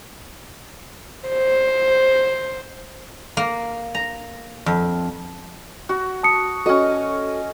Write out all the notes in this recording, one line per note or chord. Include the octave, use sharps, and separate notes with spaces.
C5
A#3
A#5
F2
F#4
A5 D#6 C#7
C#4 F#4 A4 D#5